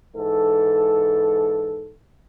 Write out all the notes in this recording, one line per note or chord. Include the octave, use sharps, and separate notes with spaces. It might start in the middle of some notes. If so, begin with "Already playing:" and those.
G#2 E3 A4